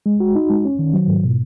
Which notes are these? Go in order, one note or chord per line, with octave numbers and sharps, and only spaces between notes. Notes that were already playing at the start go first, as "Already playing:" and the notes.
G#3
F#4
D#4
G#3
C#4
D#3
F#3
G#2
B2